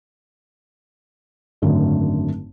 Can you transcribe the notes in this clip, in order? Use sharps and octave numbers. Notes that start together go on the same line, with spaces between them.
G#1 F#2 D3 A3